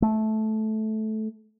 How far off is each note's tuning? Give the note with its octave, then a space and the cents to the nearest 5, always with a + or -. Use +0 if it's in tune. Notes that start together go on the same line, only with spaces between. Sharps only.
A3 -15